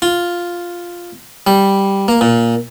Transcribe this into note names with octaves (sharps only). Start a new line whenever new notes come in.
F4
G3
A#3
A#2